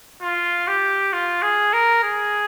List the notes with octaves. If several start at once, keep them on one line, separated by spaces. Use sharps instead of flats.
F4
G4
F4
G#4
A#4
G#4